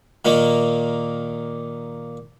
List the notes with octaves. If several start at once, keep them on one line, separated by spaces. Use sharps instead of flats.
A#2 D#3 A#3